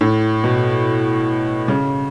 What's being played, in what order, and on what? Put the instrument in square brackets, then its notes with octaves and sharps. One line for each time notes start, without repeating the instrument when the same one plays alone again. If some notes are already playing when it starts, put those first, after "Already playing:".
[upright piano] A2
B2
C#3